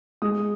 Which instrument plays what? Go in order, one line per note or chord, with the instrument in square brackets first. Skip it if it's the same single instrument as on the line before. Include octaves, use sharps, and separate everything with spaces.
[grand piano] G#3 D#6